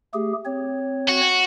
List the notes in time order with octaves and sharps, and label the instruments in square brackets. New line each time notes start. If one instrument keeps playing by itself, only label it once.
[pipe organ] A3 G4 G#4
C4 C#5
[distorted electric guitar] F#4